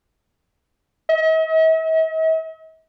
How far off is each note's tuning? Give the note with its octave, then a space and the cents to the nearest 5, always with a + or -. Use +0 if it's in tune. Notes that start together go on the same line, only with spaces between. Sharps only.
D#5 +45